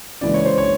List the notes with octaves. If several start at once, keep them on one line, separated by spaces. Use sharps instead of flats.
C#3 E3 G#3 D5
C#5
C5
C#5